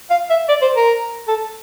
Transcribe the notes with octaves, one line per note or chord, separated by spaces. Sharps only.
F5
E5
D5
C5
A#4
A4